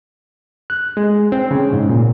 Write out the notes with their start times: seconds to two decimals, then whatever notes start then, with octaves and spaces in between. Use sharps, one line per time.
0.70 F#6
0.97 G#3
1.32 C4
1.51 C#3
1.73 G#2
1.89 A#2